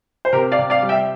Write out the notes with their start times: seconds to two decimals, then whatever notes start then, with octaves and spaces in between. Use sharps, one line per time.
0.25 C5
0.33 C3 G4 A#4
0.51 D5 F5
0.59 C3
0.70 D5 F5
0.82 G3
0.89 E5 G5